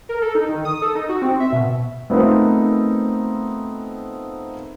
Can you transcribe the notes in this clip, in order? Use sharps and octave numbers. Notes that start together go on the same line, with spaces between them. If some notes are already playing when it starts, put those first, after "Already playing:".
A#4
A4
D#4
D#3
D#6
A4
D#4
F#4
C4
E5
B2
A3 B3 C4 D#4 F4 A#4